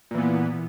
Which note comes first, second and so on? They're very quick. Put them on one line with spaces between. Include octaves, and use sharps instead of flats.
A#2 E3 B3